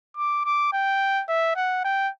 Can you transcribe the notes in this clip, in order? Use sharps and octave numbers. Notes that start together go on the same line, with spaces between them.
D6
D6
G5
E5
F#5
G5